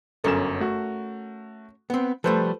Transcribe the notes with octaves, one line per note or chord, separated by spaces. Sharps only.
G1 F#2 C#4 A4 A#4 E7
A3 F#4
B3 C4
F3 G3 A3 A4 B4 C5